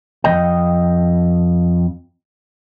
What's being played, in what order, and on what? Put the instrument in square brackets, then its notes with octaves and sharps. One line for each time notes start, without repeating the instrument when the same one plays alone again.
[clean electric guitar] F2 F#3 D#5 G5